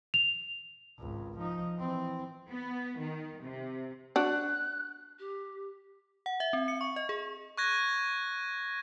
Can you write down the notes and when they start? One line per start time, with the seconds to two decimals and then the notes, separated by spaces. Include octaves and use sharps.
0.14 F7
0.99 G#1 C#2
1.39 F3 D#4
1.77 E3 C4
2.49 B3
2.99 D#3
3.41 C3
4.16 D4 F#4 F#6
5.19 G4
6.26 F#5
6.40 E5
6.53 C4
6.68 C#7
6.81 C#6
6.96 D#5
7.09 G#4
7.57 C#6 F#6 G#6 A#6